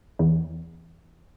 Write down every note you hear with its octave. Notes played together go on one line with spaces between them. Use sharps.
E2